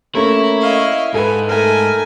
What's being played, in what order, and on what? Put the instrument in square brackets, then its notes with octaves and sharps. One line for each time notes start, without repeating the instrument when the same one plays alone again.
[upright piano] A3 A#3 C#4 [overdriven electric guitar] E4 [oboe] C#5 [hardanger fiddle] A#5
[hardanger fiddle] D#5 F5
[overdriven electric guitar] G#2 [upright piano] A4 B4 [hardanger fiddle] G#5
[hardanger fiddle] A3 G#5 [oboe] A#4